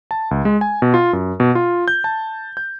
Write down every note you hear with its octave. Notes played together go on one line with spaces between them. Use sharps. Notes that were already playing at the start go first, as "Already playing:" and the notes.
A5
C#2
G#3
G#5
B2
F4
F#2
B2
F4
G6
A5
G6